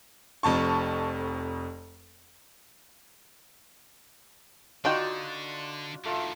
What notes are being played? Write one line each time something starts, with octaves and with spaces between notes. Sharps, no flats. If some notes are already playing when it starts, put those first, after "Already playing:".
F1 F2 A5 C#6
D3 D4 D#4 F4 F#4 G5
D3 D#3 A3 F4